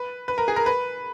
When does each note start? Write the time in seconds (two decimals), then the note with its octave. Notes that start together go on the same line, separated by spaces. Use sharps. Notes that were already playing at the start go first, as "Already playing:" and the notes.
Already playing: B4
0.28 B4
0.38 A#4
0.48 G#4
0.56 A#4
0.66 B4